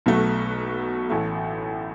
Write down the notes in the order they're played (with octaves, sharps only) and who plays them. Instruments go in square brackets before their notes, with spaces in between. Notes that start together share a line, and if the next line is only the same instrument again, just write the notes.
[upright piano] B1 B2 F#3 A3 F#4
A1 A2 A3